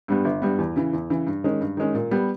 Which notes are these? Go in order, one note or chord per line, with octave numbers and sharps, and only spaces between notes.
G2 G3 B3
G1
G2 G3 B3
E2
C#3 E3
E2
C#3 E3
G2
D#3 G#3 C#4
G2
D#3 G#3 C#4
A#2
G3 B3